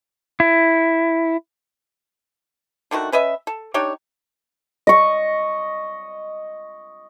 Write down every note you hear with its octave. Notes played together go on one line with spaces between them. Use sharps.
E4
D3 D#3 A3 F#4
C#4 B4 D#5 E5
A4
D4 D#4 G4 C#5
D#5 C#6